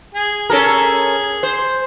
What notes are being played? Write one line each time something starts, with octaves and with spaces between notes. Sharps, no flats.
G#4
C#4 A4 A#4
C5